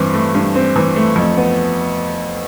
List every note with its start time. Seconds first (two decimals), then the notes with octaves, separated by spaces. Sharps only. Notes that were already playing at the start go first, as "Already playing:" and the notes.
Already playing: G2 E3 C4
0.14 A3
0.35 G2
0.55 C4
0.76 E3
0.96 A3
1.16 F2
1.37 B3